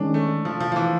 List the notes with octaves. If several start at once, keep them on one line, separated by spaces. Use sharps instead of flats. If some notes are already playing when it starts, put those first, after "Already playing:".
Already playing: D#3 G#3 C#4 D4
A3
F3
F3
F3
E3